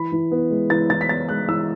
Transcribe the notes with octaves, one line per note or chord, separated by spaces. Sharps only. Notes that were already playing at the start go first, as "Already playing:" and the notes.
Already playing: E3 B5
E3
B3
G#3
E3 A6
E3 A6
B6
B3 A6
G#3 F#6
E3 E6